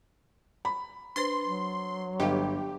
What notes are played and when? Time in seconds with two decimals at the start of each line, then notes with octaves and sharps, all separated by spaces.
0.65 B5
1.16 D4 B4 C5 C6
1.46 F#3
2.20 G1 G4 D#5 F5